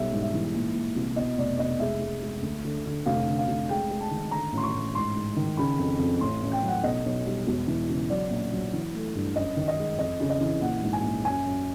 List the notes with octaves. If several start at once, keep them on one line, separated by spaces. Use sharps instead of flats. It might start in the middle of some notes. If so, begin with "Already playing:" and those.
Already playing: B1 G3 E5
G#2
E5
E3
A#2
A#2
C2
B2 D#5
F1 D5
F1 D#5
G#3 E5
G#3
G#3
D2
D3
D3
F1 F5
D3
F5
F1
G#3 G5
G#3
A5
D#3
D3 A#5
A1 C6
C#6
A1
G#2 C6
G#2
D#3
C#3 B5
F2
F2
A1 C6
A1
G5
F#3
F#5
B1 D#5
B1
G3
E1
E3
C#3
F#3 D5
A#1
F#3
E3
A3
G2
F#2 D#5
D#3
D#5
G#3
F2 D#5
C#3
D#5
E3
A#1 F#5
G#2
G#5
A#1
F#2 G#5
F#2